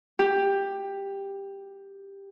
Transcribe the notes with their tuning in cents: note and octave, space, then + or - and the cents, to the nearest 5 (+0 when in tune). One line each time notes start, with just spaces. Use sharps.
G4 +10